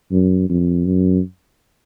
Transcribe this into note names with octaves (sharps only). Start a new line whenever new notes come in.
F#2
F2
F#2